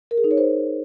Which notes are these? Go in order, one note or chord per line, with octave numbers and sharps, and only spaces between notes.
A#4
G#4
D#4
C#5
C5